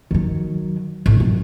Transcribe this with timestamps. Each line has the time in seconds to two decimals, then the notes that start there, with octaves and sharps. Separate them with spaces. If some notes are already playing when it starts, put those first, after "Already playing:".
0.11 D#3 F#3
1.06 A1
1.20 F#2